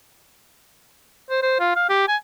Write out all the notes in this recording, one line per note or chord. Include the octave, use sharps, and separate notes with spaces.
C5
C5
F4
F5
G4
G#5